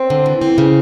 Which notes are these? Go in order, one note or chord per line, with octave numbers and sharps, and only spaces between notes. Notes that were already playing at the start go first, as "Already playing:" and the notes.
Already playing: C4
D3
E3
C4
C#3